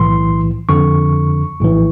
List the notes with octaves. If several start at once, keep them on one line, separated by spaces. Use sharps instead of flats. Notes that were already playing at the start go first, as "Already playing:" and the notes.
Already playing: B1 A2 E3 C6
F2 D3 C#6
A#1 A2 E3